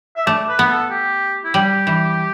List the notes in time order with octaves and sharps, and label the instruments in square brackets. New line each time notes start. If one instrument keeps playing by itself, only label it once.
[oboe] E5
[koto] A3 [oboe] D5
[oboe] B4
[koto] B3
[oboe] A4
G4
E4
[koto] G3 [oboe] G4
[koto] E3